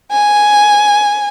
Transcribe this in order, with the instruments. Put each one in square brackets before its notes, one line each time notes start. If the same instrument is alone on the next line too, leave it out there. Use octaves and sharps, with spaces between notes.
[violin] G#5